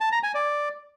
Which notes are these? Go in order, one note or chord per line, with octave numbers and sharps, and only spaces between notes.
A5
A#5
G#5
D5